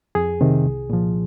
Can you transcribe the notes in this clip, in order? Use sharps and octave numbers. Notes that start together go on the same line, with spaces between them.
F2 G#4
C3 D#3
C2
A#2 F3